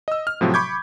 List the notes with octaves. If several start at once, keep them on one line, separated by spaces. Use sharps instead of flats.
D#5 E6
F6
A2 C3 F3 F#3
B5 C#6 D6 G6 G#6